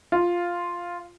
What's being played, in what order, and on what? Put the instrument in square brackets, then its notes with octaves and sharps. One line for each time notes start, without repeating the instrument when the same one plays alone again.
[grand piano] F4